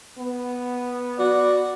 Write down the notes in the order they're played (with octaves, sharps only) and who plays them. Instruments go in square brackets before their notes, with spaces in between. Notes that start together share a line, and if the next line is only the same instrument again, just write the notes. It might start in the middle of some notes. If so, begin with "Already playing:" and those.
[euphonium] B3
[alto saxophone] F#4 [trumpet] D5